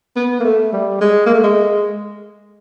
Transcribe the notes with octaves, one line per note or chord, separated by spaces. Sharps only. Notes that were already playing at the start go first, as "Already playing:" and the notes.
B3
A#3
A3
G3
G#3
A#3
A3
G#3